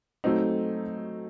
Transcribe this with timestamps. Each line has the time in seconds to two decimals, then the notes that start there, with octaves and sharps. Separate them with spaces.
0.24 F#3 A3 C4 D#4